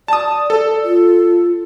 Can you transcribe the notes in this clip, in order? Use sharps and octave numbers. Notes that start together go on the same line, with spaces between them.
D5 A5 D#6
A4 D5
F4